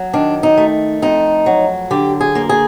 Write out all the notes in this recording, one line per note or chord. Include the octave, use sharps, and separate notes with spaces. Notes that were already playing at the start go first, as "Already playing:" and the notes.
Already playing: F#3
D#3 D4
D#4
A3
F2 D#4
F#3
D3 G4
G#4
A#3
G#4